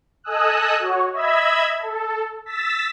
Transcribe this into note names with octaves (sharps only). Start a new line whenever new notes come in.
A4 D#5 G#5 D#6 E6 F#6
F#4 C#5
D#5 E5 B5 E6 G#6
A4
E6 A6 B6